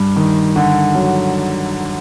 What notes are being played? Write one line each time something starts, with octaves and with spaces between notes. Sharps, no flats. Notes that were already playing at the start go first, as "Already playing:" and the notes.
Already playing: G2
D#3
D3
F#3